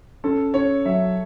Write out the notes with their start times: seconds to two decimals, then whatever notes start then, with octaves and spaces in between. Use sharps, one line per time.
0.24 C#4 A4
0.54 C#4 C#5
0.85 F#3 E5